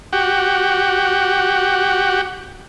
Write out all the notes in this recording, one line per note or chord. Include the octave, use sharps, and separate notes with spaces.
F#4 G4